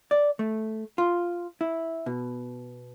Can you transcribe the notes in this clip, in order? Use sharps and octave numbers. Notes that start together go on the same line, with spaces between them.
D5
A3
F4
E4
B2